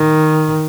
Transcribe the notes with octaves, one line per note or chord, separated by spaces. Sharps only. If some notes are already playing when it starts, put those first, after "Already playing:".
Already playing: D#3